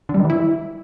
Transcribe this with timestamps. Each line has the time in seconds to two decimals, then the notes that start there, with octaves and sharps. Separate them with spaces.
0.09 D3
0.14 G3
0.19 D#3
0.24 E3
0.30 E4